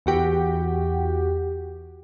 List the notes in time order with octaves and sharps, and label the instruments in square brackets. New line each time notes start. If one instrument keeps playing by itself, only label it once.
[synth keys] E2 F#4 G4